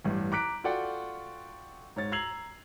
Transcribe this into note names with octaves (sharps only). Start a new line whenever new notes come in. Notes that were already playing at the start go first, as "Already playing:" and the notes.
A1 G2
A#5 D6 F#6 B6 D7
F4 F#4 A4 D5 F#5 G5
G#2 C#5 A6
A#5 E6 G#6 C7 F7 F#7